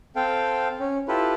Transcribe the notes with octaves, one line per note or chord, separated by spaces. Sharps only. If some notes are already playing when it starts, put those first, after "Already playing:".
C4 A4 F5 G5
C#4
E4 F4 G4 A4 B4